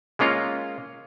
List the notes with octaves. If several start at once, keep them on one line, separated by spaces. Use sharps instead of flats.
G#3 A#3 C#4 F4 D#5 F5